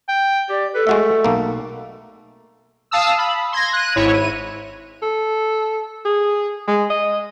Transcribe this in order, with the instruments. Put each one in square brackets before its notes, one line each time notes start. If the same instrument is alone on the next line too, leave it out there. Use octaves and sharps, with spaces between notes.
[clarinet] G5
[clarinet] G4 [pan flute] D5
[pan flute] A4 [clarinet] B4
[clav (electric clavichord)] G#3 F#4 E5 [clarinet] A3
[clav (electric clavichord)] B1 A#3
[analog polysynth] F5 A5 D#6 E6
B5
C6 G#6 A#6
F#6 D#7
G#1 G#2 E4 C#5
D#7
[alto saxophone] A4
G#4
G#3
D#5